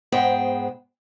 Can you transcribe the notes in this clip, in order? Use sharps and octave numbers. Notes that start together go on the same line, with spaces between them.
G#2 B3 G#4 C5 G5